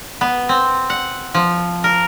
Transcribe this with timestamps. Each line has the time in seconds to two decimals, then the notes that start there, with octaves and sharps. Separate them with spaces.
0.21 B3
0.49 C4
0.90 F#5
1.34 F3
1.84 A#4